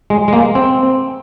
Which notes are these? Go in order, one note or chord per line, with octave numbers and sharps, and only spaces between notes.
G#3
G#3
A#3
C4